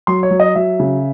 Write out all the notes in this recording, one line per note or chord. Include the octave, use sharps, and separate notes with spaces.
F#3 C6
C#5
F#3
D#5
F#3 E5
C#3